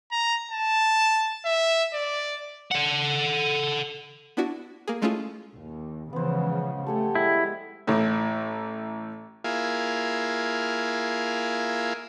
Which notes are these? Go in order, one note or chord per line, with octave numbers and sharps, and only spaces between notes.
A#5
A5
E5
D5
A4 F#5
B3 D4 E4 F#4
A#3 G#4
G#3 A3 C#4 E4 F4 G#4
D#2
C#3 E3 F3 G#3 B3 C5
A3 G4 A4 F#5 G#5
G3 G#3 E4 G5
A1 A2
A#3 E4 F4 G#4